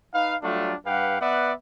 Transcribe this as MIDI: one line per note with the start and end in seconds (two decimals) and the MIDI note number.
0.14 0.35 63
0.14 0.35 71
0.14 0.35 77
0.42 0.74 54
0.42 0.74 55
0.42 0.74 57
0.42 0.74 62
0.42 0.74 65
0.86 1.19 43
0.86 1.19 67
0.86 1.19 71
0.86 1.19 77
0.86 1.19 78
1.20 1.52 59
1.20 1.52 71
1.20 1.52 74
1.20 1.52 76
1.20 1.52 78